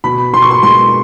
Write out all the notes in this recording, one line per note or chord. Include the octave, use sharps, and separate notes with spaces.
B2 B5
B2 C6
C#6
C6
G#3 C6